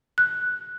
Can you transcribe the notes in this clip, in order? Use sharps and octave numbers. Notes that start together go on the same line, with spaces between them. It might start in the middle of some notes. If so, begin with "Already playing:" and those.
F#6